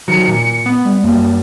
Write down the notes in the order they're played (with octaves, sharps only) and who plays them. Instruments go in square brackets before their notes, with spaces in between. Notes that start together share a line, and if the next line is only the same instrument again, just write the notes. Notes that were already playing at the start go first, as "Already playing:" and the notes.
[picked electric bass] D#3 F#3 [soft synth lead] C#7
[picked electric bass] A#2
B3
[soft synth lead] G3
[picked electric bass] F#2 G3 [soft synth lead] A#3